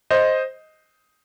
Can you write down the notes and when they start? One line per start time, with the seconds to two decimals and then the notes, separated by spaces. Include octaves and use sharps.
0.10 C5 D#5